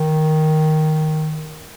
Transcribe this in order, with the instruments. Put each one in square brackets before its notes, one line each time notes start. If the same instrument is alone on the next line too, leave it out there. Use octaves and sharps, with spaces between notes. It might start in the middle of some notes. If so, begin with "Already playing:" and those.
Already playing: [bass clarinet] D#3